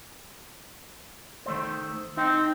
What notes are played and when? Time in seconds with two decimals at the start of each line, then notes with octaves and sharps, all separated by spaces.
1.46 D#3 A3 C5
2.17 C4 D#4